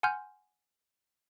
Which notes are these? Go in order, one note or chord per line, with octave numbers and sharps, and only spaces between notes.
F#5 G#5 C6 F6 G6